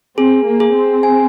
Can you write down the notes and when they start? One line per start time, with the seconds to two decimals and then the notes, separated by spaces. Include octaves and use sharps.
0.17 C4 G#4
0.45 A#3
0.60 G#4
0.74 C4
1.03 G#5